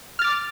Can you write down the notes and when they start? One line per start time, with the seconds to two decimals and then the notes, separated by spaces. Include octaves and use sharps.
0.19 F6
0.22 A6
0.24 D6